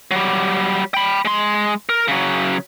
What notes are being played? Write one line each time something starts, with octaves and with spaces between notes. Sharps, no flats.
F#3 G3
G5 B5
G#3 C6
A#4
C#3 F#3